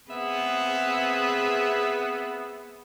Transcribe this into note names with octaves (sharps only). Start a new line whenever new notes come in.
B3 C4 G#4 B4 E5